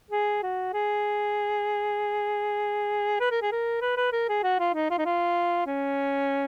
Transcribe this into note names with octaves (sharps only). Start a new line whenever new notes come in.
G#4
F#4
G#4
B4
A#4
G#4
A#4
B4
B4
A#4
G#4
F#4
F4
D#4
F4
D#4
F4
C#4